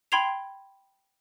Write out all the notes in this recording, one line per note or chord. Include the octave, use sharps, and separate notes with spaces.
G5 B5 C6 G#6 C7 F7